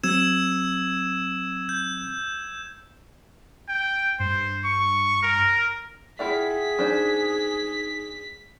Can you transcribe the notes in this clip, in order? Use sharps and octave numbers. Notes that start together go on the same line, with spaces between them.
F#3 C4 E6 G#6 E7
G6
G5
G2 C5
C#6
A#4
E4 F4 G#4 D5 E5 F#5 G5 B6
F#3 D4 D#4 C5